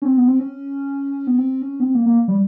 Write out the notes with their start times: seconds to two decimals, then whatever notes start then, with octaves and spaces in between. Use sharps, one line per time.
0.02 C#4
0.05 C4
0.17 B3
0.28 C4
0.39 C#4
1.27 B3
1.38 C4
1.62 C#4
1.80 B3
1.83 C4
1.95 A#3
2.06 A#3
2.28 G3